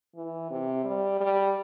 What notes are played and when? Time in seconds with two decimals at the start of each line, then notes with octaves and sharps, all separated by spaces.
0.16 E3
0.50 C3
0.85 G3
1.20 G3